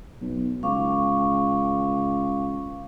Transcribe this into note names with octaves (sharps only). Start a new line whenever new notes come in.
B1
C#2 F5 C#6 D6